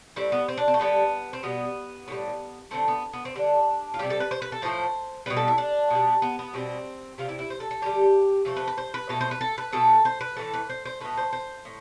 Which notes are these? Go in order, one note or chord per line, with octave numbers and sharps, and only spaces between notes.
A2 G3 C4
B3
C4
D4
C4
A3
D3 G3 B3
C4
B2 G3 B3
A2 E3 G3
D3 A3 C4
B3
B3
C4
D3 G3 D4
F4
C3 G3 G4
A4
B4
C5
B4
A4
A2 F3 A3 C5
B2 G3 B4
A4
E4
D4
B2 G3
B3
B3
B2 G3 C4
C3 G3 F4
E4
E4
C5
A4
A4
D3 G3 G4
C3 F3 A3
B4
B4
C5
B4
B2 A3 A4
C5
B4
A4
B4
B2 A3 A4
C5
B4
A2 E3 A3 A4
B4
C5
C5
B2 A3 B4
C5
C5
A2